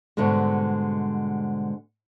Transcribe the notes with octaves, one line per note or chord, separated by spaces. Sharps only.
G#2 B2 D3 G3 G#3